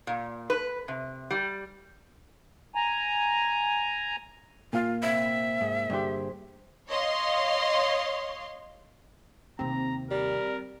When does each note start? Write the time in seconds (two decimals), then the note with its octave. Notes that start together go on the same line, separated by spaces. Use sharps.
0.07 A#2
0.50 B4
0.88 C3
1.31 G3
2.75 G#5 A#5
4.73 A#2 A#3 F4 F5
5.03 C3 E5
5.61 G#2
5.90 G2 D3 G4 G#4 C5
6.88 C#5 D#5 F5 C6
9.59 D#2 C3 C4 A#5
10.11 G3 A#4